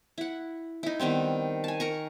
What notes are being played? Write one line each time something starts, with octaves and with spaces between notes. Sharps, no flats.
E4 F#5
D#4 E4
D#3 G3 B3 C4
G#5 A5
A#4 A#5 C#6